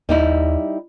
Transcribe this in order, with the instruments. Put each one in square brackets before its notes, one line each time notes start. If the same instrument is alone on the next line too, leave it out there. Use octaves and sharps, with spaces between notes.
[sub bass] D#2 [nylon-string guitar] G3 D#4 E4